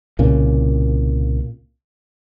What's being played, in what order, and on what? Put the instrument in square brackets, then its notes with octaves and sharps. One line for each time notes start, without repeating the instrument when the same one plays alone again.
[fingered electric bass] C2 A#2 C#3